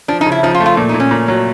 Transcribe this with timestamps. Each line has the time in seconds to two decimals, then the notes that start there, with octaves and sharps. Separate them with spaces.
0.08 F3 D4
0.21 D#4
0.26 C#3
0.32 E4
0.43 F3 D#4
0.55 F4
0.60 A3
0.66 F4
0.77 A#2
0.89 D#4
0.94 A#2
1.00 C#4
1.11 A#2
1.28 F#3